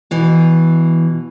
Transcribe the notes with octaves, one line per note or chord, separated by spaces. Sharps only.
B2 E3